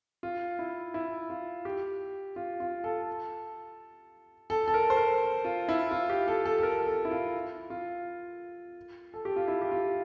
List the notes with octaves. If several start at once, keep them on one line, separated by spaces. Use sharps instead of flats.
F4
E4
E4
F4
G4
F4
F4
A4
A4
A4
A#4
C5
A#4
F4
E4
F4
G4
A4
A4
A4
A#4
A4
E4
F4
F4
A4
G4
F4
E4
G4
F4